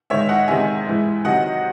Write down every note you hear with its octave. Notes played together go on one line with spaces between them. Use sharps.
G#2 D#3 G#3 C#5 E5
D#5 F#5
E2 C3 D#3 G#3 E5 G#5
G#2 E3 G#3
C3 D#3 F#3 D#5 F#5